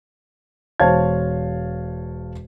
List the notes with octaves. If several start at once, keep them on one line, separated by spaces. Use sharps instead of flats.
E1 C5 C#5 F5 A5 G#6